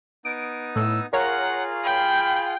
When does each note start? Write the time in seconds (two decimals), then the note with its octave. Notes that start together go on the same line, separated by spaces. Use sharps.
0.25 B3 D#4 D#6 D7
0.76 A2 E6
1.13 F4 G#4 A#4 C#5 F5 F#5 A#5
1.84 G5 B5